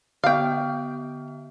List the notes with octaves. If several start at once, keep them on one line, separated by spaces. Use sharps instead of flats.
D3 B3 F5 G5